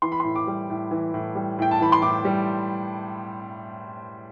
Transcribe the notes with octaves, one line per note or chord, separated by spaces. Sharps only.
E3 C6
B5
C6
A2
D6
G3
A2
E3
A2
G3
A2 G5
A5
E3 B5
C6
A2 D6
G3